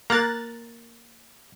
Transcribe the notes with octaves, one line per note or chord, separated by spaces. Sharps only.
A#3 A#5 F#6 A6